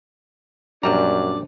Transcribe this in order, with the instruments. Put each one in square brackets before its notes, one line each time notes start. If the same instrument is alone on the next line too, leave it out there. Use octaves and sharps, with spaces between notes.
[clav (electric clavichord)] A#1 G3 A#5 [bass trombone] F#2 [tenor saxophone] D4